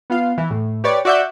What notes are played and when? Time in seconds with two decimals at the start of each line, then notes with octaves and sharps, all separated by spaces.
0.10 B3 F4 F5
0.38 E3
0.50 A2
0.84 G4 B4 C#5 D5
1.05 F#4 D5 E5 F#5 G6